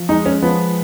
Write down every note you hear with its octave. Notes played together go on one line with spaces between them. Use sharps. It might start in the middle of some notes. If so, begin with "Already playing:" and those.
Already playing: F3
G#3 D#4
C#4
F3 B3